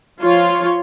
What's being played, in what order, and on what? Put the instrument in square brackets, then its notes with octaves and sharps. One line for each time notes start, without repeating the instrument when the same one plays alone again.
[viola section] F3 F4 C#5